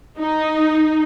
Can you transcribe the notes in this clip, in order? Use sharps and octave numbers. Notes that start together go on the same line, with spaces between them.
D#4